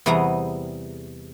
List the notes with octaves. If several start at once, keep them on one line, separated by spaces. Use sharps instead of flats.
E2 C3 G3 B3 G#4 A#5